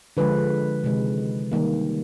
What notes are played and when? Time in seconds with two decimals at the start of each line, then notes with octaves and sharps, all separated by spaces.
0.17 D3 F3 G#3 B4
0.84 C3 D#3 G#3
1.52 D#3 G3 A#3